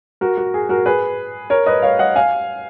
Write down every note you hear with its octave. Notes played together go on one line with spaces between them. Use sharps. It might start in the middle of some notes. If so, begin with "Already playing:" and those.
F#4 A#4
F#4
G#4
F#4 A#4
G#4 B4
A#4 C#5
B4 D#5
C#5 F5
D#5 F#5
F5 G#5